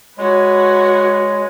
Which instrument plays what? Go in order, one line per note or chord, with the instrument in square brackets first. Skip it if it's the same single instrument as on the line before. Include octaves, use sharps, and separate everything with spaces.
[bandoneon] G#3 [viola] F#4 B4 [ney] C#5